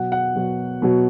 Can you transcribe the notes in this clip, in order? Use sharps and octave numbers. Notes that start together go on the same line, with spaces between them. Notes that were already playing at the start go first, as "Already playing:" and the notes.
Already playing: B2 F#3 F#5
F#5
B2 F#3
B2 F#3